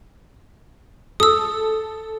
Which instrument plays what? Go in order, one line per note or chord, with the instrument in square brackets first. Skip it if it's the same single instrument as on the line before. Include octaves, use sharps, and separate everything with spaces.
[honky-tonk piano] A4 [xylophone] D#6 E6